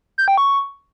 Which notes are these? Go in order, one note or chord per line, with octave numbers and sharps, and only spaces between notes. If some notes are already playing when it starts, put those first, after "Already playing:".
G6
G5
C#6